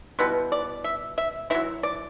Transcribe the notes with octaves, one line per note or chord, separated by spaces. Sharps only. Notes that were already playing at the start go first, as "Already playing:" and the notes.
B2 G3 B3 E4 B4
D5
E5
E5
F#3 C4 E4 E5
D5